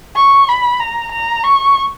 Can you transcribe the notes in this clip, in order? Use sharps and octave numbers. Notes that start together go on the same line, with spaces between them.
C#6
B5
A#5
A#5
C#6